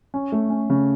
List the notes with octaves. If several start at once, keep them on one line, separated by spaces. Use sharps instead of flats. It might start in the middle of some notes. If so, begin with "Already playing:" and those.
C#4
A3
C#4
C#3